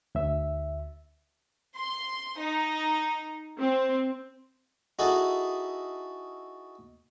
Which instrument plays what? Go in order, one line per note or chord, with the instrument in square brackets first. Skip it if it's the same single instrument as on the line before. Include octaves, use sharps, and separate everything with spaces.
[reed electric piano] D2 E5
[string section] C6
D#4
C4
[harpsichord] D#4 E4 F#4 G#4 A4